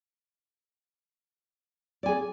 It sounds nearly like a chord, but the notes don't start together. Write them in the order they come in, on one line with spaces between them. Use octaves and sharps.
D5 G#5 G#4